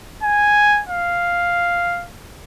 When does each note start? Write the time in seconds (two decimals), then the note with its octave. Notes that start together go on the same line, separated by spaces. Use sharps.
0.23 G#5
0.89 F5